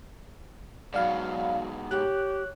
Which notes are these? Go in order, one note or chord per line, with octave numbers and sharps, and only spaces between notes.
G#2 B2 F#3 D5 F5 B5
G4 C#5 F#6